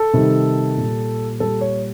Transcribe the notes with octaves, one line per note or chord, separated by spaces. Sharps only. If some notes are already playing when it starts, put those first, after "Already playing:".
Already playing: A4
C3 D#3 G3
A#2 G3
A#2 G3 A4
C#5